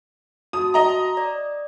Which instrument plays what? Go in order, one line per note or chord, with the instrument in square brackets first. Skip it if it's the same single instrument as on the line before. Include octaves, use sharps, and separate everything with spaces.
[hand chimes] F#4 A5 [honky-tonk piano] D#6
[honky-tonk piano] D#5 A#5
[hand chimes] D5